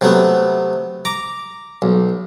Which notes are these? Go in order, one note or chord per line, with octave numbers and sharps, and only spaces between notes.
C3 F#3 A3 B3
A#5 D6
B1